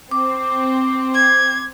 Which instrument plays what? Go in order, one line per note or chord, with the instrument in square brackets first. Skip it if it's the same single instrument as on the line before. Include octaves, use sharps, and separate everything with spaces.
[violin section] C4 [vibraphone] D6
[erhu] G#6